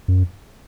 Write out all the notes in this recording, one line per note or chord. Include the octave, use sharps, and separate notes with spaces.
F#2